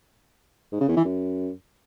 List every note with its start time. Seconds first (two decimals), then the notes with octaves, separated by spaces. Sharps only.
0.72 G#2
0.80 C#3
0.88 E2
0.96 E3
1.05 F#2